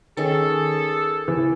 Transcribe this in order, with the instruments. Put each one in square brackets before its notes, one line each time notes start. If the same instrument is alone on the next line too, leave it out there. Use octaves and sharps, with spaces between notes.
[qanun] D#3 C#4 [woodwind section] G#4 A4
[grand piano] E3